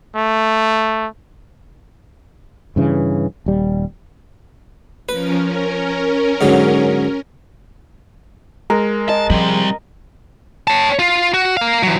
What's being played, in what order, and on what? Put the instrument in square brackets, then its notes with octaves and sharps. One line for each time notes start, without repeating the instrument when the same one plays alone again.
[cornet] A3
[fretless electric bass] G2 C#3 E3
D#1 G3
[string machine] F3 C#4 A#4 [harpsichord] B4
[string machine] C#4 A#4
[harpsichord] G#2 D3 F#3
[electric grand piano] G#3 [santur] A#4
[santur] D#5 [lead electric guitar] A5
[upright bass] F3 [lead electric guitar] G3 C4
[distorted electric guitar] C#5 A5
F4
F#4
A#4 F5
E3 F#3